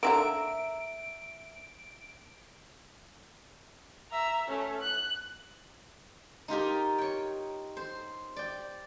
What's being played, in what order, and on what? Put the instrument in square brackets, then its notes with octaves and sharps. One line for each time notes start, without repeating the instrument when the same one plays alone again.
[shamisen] D3 F3 A#3 [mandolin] E5 A#5 [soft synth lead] D7
[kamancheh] E5 A#5
A3 C#4
F#6
[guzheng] D#4 F4 G4 A#4
C#5 G5
C5
D5 G5